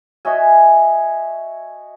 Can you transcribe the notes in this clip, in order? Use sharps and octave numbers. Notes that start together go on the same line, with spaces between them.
F#4 D#5 E5 G#5